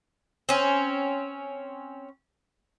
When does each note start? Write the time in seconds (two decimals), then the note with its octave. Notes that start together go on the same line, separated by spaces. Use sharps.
0.49 C4 C#4